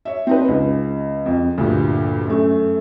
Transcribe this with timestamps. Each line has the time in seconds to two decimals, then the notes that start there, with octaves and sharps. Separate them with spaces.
0.05 C#5 E5
0.27 C4 D#4 B4
0.48 C#2
1.26 F2
1.58 D2 G2 A#2
2.27 F#2 A3